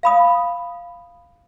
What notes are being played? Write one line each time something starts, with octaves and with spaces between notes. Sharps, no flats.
F5 B5 D#6